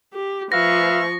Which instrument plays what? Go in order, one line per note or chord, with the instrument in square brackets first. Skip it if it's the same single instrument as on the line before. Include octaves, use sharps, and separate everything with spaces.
[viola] G4
[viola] F3 C#6 [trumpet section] B4 E5 F5 [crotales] A#6